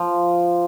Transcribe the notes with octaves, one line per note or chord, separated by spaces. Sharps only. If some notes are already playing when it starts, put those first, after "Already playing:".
Already playing: F3